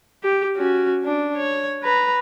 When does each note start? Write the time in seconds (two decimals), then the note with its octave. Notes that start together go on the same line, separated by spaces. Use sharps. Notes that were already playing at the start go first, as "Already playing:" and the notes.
0.23 G4
0.56 C#4 F#4
1.04 D4
1.37 C#5
1.83 B4 A#5